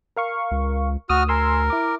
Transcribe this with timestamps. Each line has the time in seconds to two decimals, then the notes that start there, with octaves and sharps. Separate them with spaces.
0.16 A#4 F5 C#6
0.51 C#2
1.10 D2 F#4 D#6 F6
1.29 A#4 G#5 C6 E6
1.70 E4 D6